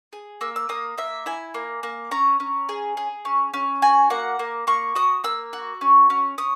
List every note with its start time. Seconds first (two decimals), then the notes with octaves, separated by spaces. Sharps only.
0.13 G#4
0.41 A#3 E6
0.56 E6
0.69 A#3 D#6
0.98 A#3 E5
1.26 E4 G#5
1.54 A#3
1.83 A#3
2.11 C#4 A#5
2.40 C#4
2.69 G#4
2.97 G#4
3.25 C#4
3.54 C#4
3.82 F#4 G#5
4.10 A#3 F#5
4.39 A#3
4.67 A#3 C#6
4.95 F#4 D#6
5.24 A#3 E6
5.53 F#4
5.81 C#4
6.10 C#4
6.38 C#4 D#6